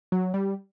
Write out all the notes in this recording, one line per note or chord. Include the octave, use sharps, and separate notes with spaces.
F#3
G3